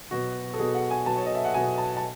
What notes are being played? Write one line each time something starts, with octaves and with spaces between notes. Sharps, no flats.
B2 F#3 B3 F#4
A4
B2 F#3 B3 G#4
F#5
G#5
B2 F#3 B3 A5
C#5
D#5
E5
F#5
B2 F#3 B3 G#5
A5
A5